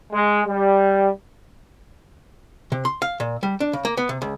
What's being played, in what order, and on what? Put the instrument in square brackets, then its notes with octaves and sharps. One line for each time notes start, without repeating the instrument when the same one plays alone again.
[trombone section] G#3
G3
[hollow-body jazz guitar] C3
C6
F5
A#2
G3
D4
C#3
A#3
B3
C3
C#2